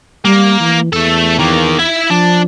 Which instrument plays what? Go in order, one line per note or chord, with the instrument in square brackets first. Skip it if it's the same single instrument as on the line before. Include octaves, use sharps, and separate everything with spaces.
[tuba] G3 [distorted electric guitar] A#3
[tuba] E3
[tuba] E2 [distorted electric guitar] A3 A4
[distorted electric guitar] D#3 A#3
E4 E5
[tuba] F3 [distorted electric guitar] D4